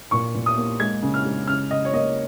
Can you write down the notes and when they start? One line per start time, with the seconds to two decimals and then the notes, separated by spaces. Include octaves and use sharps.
0.11 A#2 C#6
0.34 A#2
0.46 D#6
0.57 A#3
0.80 G#3 G#6
1.03 C#3
1.14 F6
1.25 G#3
1.47 C#3 F6
1.71 C#3 D#5
1.85 C#5
1.93 A#3 D#5